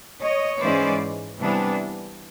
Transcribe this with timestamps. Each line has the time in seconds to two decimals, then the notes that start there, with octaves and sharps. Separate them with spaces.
0.22 C#5 D#5
0.61 G#2 E3 G#3 C#4 C5 D5
1.40 C3 E3 G3 B3 D4